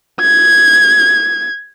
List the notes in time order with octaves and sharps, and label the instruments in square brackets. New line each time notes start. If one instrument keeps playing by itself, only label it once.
[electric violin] G#6